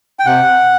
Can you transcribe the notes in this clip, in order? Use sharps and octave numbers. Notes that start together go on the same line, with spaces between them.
G5
C3 F#5